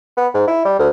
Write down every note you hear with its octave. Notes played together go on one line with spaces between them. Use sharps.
B3
G#2
E4
G3
D2